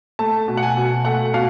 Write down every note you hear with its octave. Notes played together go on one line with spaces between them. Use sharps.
A3 A5
B2
F#5
G#5
B2
A3 F#5
B2 F5